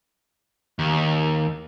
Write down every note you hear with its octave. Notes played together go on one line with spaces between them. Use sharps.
D#2